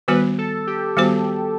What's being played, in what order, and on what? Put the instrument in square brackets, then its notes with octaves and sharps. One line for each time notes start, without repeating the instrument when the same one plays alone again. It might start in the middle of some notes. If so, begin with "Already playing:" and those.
[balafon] D#3 G3 B3 F#4 C5 [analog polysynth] B4
[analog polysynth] A4
G4
[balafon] D#3 G3 B3 F#4 C5